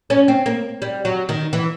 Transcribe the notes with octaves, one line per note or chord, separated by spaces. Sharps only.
C#4
C4
A#3
G3
F#3
D#3
E3